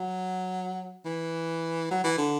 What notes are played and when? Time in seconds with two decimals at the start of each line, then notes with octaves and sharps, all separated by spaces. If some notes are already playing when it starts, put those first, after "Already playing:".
Already playing: F#3
1.05 E3
1.91 F#3
2.04 E3
2.18 D3